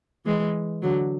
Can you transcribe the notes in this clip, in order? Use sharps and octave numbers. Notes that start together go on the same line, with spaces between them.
E3 G#3
D3 F#3